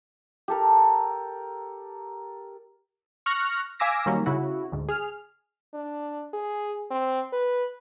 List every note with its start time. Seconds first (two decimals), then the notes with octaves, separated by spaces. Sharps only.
0.48 G4 A4 A#4
3.26 C#6 F6 F#6 A#6
3.79 F5 G#5 D6 E6 A#6 B6
4.06 D#3 F#3 G3 A#3 C#4
4.26 C#3 E4 F#4
4.72 D2 G#2
4.89 G#4 F6
5.74 D4
6.33 G#4
6.91 C4
7.33 B4